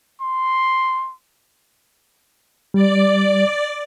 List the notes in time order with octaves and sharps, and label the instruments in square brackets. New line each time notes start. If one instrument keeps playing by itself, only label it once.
[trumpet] C6
[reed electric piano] G3 [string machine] D5